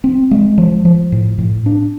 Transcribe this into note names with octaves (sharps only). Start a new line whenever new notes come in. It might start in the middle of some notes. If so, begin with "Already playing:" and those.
C4
G#3
F3
F3
A2
A2
D4